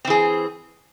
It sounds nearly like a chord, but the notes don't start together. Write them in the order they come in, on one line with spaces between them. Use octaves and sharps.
C4 E3 G#4